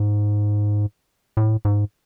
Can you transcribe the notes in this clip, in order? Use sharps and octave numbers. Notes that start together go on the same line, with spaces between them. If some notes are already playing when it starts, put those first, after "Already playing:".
Already playing: G#2
A2
G#2